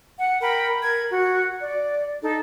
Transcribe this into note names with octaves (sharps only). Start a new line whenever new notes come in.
F#5
A#4 G5 B5
A#4 G#6
F#4
D5
D#4 A4